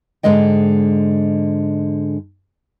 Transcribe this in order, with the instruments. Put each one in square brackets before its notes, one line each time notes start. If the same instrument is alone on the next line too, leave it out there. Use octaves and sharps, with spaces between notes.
[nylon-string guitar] G#2 D3 F#3 G#3 D#5 G5